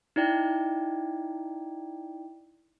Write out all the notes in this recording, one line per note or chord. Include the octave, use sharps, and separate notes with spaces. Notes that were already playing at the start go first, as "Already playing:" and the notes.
D#4 E4 D5 G5